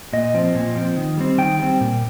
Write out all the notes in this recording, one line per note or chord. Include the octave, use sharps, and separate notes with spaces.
A#2 D#5
F3 C4
A#2
F3 C4
D#3
G3 C4
D#3 G5
G3 C4
A#2